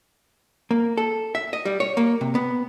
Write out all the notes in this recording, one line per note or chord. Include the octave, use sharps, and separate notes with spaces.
A#3
A4
E5
D#5
G3
C#5
A#3
C3
B3